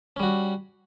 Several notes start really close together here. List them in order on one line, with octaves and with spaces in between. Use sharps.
C#4 G3 F#4